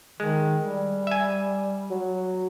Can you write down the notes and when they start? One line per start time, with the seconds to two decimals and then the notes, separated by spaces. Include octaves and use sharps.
0.20 D#3 G#3
0.61 G3
1.07 E5 G#5
1.90 F#3